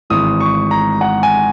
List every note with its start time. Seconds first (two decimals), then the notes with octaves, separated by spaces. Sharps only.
0.10 G#1 G#2 E3 D#6
0.40 C#6
0.71 A#5
1.01 F#5
1.23 G#5